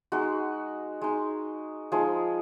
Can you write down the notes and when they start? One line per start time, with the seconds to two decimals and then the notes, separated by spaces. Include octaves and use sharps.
0.12 G#3 D#4 F#4
1.01 G#3 D#4
1.92 F3 G#3 D#4 G#4